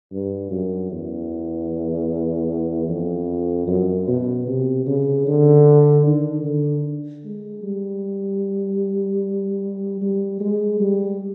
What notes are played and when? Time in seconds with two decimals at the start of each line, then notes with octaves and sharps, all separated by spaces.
0.12 G2
0.51 F#2
0.92 E2
2.89 F2
3.68 F#2
4.08 B2
4.47 C3
4.87 C#3
5.27 D3
6.06 D#3
6.45 D3
7.25 G#3
7.63 G3
10.02 G3
10.41 G#3
10.80 G3